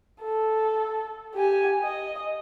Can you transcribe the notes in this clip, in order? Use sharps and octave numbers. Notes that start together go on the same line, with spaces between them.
A4
G4 G#5
D#5